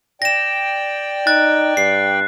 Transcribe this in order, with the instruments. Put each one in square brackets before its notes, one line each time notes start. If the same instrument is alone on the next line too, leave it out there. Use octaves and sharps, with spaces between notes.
[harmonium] D5 G5 [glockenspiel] A#6 E7
[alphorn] D#4 [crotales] F#6 [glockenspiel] A6
[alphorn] G2 [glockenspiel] C7